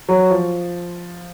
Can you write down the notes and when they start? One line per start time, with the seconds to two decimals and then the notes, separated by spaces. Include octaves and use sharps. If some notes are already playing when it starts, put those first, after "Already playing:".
0.09 F#3
0.30 F3